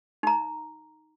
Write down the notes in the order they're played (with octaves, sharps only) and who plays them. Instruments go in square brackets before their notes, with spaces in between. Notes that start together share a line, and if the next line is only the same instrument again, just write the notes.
[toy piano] D#4 A#5